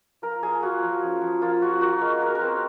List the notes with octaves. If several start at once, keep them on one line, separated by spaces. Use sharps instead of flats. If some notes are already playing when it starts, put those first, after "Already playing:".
F3 A#4
A#3 G#4
F4 F#4
F3
C#4
F3
A#3 F4
F4 F#4
A#3 F#4
G#3 A#4
G#3 A#4
A#4
C4 C5